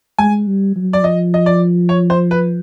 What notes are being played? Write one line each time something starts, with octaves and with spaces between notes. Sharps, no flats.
G#3 G#5
G3
F#3
D5
F3 D#5
D#5
D5
C#5
C5
B4